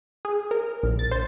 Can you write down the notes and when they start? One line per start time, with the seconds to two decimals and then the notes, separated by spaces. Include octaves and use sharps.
0.25 G#4
0.51 A#4
0.83 A#1
0.99 A6
1.11 C5